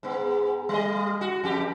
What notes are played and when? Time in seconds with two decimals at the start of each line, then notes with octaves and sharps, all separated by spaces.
0.03 G#2 B3
0.69 G3 D#5
1.21 F#4
1.44 F2 G4